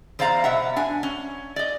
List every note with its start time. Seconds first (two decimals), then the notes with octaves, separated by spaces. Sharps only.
0.19 E2 C5 D5 F5 A#5
0.44 B2 E5 F#5
0.76 D4 G#5
1.03 C#4
1.56 D5 D#5